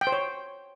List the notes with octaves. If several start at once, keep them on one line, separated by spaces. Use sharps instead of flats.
G5
C5
C#5